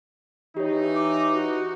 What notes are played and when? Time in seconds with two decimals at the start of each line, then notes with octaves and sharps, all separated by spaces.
0.57 E3 D#4 G4 C#5
0.94 D6
1.32 F#4